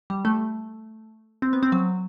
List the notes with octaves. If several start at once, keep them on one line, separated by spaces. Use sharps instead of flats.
G3
A3
C4
B3
C4
F#3